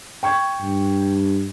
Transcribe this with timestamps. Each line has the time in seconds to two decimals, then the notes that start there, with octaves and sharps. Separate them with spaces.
0.23 G5 C#6 G#6
0.61 G2